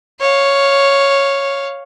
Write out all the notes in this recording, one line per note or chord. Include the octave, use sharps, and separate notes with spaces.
C#5 F5